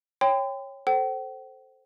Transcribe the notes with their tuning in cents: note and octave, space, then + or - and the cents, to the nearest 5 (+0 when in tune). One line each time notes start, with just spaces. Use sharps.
C#5 -15 G5 +15 C6 -45
A4 +0 C5 +0 G5 -45